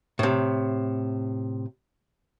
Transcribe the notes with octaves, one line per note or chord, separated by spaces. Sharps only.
A2 C3